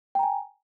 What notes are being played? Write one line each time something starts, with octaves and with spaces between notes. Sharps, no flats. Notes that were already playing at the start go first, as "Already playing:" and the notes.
G5 G#5 A#5